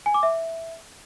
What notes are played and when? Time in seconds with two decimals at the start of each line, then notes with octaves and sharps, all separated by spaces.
0.06 G#5
0.14 D6
0.23 E5